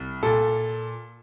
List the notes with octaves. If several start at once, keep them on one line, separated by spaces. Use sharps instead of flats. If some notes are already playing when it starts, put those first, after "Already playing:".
Already playing: C2
A#2 A4